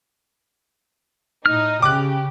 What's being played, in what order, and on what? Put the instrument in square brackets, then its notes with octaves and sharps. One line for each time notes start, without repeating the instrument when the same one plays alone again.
[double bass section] A2 [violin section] D#4 D#5 [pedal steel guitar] F6
[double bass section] C#3 [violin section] G4 [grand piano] D6 F#6